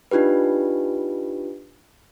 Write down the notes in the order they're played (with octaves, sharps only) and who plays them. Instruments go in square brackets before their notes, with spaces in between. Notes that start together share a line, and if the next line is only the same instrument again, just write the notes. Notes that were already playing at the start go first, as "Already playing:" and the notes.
[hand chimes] D4 D#4 F4 G4 B4